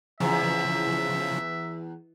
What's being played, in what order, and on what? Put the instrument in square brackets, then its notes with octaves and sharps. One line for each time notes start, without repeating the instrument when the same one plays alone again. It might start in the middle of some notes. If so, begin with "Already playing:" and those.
[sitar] E2 [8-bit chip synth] C#3 F3 [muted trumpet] E5